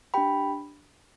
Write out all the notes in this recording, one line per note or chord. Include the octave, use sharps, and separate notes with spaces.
D4 G4 G5 B5